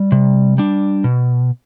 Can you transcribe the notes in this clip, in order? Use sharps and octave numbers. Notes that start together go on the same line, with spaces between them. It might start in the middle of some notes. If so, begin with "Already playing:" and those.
Already playing: G3
C3
G3 D4
B2